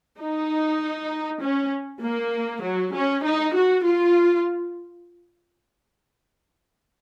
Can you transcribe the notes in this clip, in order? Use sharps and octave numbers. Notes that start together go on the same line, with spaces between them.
D#4
C#4
A#3
F#3
C#4
D#4
F#4
F4